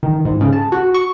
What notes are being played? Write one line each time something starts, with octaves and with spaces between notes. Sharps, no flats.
D#3
G#2
C#3
A5
F#4
C#6